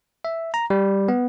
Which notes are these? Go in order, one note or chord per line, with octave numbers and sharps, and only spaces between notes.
E5
A#5
G3
B3